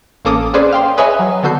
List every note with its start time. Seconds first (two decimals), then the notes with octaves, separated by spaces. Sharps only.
0.25 A1 A#3 C#4 A4 D6 D#6
0.54 C#4 G#4 B4 C5 D5
0.72 F5 G5 C6
0.97 G#4 B4 C#5 D#5 E5 G#5
1.19 F#3
1.43 D3 B3 F#4 A4 G6 C7